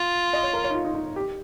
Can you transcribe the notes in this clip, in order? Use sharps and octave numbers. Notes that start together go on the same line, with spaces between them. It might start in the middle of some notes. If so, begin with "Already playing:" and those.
Already playing: F4
D#5
C#5
A#4
C#5
D#4
F4
D#4
D#4
G4